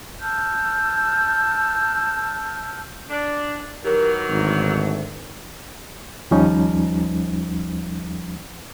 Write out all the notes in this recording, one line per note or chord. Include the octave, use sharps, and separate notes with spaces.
A5 E6 F6 G6
D4
D#3 E3 F#3 G4 A#4
G#1 D2
D#2 F3 G3 C#4 D#4